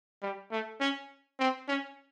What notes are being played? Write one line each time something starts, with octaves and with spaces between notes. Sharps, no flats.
G3
A3
C#4
C4
C#4